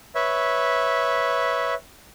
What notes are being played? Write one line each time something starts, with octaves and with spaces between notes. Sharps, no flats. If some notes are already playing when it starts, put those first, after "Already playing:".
B4 C#5 E5